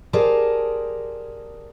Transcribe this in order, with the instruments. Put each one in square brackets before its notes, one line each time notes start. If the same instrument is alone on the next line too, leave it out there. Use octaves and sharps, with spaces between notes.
[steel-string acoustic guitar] G4 G#4 A#4 C5 D5 A5